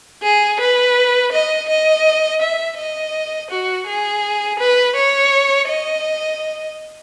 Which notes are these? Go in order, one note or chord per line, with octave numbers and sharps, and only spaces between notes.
G#4
B4
D#5
D#5
E5
D#5
F#4
G#4
B4
C#5
D#5